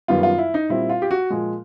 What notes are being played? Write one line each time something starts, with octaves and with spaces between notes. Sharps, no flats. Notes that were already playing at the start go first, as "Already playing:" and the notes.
F#2 D#3 G3 B3 F4
F4
E4
D#4
A#2 G3 C4 E4
F4
G4
F#4
A#2 F3 G#3